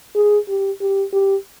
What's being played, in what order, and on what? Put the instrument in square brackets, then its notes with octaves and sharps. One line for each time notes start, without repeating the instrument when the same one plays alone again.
[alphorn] G#4
G4
G4
G4